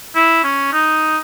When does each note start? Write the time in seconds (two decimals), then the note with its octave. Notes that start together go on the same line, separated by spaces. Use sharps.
0.15 E4
0.44 C#4
0.73 D#4